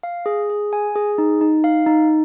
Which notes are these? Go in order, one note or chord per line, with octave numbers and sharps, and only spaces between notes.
F5
G#4
G#4
G#5
G#4
D#4
D#4
F5
D#4